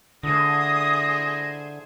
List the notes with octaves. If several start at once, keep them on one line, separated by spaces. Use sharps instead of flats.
D3 E4 G#4 C5 D#6 A#6